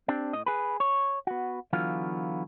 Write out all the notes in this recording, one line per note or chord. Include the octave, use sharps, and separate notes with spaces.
C4 D4 G4
A2 D#5
G#4 B4
C#5
B3 F#4
D3 E3 F#3 B3 F4 F5